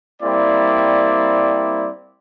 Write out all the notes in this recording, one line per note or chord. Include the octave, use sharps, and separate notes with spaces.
G3 A#3 C4 E4 D5